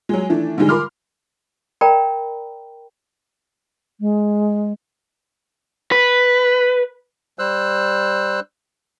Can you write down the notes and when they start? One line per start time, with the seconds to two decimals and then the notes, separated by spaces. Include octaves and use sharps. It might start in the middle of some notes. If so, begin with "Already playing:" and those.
0.09 F#3 G#3
0.29 D#3 E3 A3 D4
0.57 G#2 D3 D#3 F3 G3 G#3
0.69 A#4 B5 C6 D6 F6
1.81 A#4 D5 G5 A#5 B5
4.00 G#3
5.92 B4
7.39 G3 C5 E6 F#6